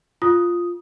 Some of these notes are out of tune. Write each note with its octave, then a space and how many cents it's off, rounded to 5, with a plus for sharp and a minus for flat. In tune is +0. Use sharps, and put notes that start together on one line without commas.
F4 +0 D#6 +0